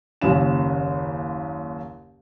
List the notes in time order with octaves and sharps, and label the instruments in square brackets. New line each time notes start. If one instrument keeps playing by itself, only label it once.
[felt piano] F#1 D#2 C#3 E7